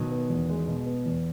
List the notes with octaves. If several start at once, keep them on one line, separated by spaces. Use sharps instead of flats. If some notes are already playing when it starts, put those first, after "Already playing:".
Already playing: B2 D#3 F#3
B3
E2
G#3
B2
B3
E2